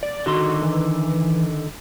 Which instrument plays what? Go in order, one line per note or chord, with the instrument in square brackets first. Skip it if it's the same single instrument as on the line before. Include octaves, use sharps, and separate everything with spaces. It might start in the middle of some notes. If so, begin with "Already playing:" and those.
[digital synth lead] D5
[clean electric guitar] D3 D#3 C6 [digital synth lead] F#4
[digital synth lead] E3